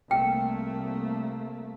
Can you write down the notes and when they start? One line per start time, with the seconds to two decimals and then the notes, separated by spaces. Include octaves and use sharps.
0.11 C2 A3 A#3 G5